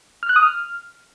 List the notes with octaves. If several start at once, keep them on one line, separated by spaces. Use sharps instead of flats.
F6
F#6
D#6
F6